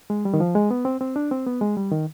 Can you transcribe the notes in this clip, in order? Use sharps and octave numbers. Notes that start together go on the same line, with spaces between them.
G#3
G3
D#3
F3
G#3
B3
C4
C4
D4
C4
B3
G#3
G3
D#3